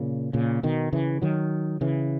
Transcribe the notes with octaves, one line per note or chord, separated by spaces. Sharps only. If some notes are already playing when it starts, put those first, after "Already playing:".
Already playing: A#2 C#3
A#2 C#3
B2 D#3
C#3 E3
D#3 F#3
C#3 E3